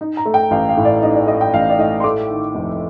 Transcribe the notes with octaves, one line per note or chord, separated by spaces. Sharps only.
D#4
A#5
A3
G5
A1 F5
F5
A2
D5
D#4 D#5
D5
A3 D#5
G5
A1 F5
D5
A2 D#5
C6
A3 D6
D#3
F1